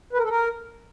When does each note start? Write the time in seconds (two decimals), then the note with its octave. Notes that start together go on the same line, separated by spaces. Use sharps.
0.13 B4
0.18 A#4
0.24 A4
0.29 A#4